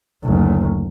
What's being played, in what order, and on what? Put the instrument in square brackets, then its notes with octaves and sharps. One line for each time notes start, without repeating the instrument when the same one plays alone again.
[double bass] F#1 D2